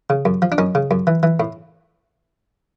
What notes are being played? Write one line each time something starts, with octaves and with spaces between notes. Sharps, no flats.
C#3
F#2
F3
D4
F#2 C#4 D#4
C#3
F#2
E3
E3
A2